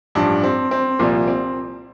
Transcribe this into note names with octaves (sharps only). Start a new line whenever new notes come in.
A1 G2 F3 D4
C4
C4
C2 A#2 F3 A#3
C4